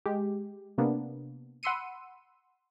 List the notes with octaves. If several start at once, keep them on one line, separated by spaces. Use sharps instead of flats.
G#3 G4
C3 A#3 B3 D4
F#5 B5 C6 E6 C#7 D#7